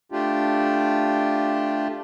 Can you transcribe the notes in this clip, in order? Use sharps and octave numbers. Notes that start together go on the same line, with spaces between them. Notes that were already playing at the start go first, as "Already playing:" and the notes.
A3 D4 F4 G4